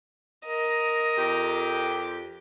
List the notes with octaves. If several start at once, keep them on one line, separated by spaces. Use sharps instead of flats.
A#4 D#5
F2 G4